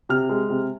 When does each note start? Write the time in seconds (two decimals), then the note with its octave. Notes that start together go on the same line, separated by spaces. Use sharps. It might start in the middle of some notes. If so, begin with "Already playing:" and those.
0.09 C3 F6
0.29 G#3
0.50 C3